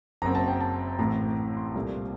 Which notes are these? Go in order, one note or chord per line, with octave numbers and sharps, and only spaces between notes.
F#1 F#2 F#3 C4 A#5
A5
G5
A5
A1 A2 A3 C4 A#5
C6
C2 A#2 A3 C4